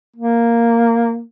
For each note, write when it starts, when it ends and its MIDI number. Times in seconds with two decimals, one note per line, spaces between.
0.16 1.21 58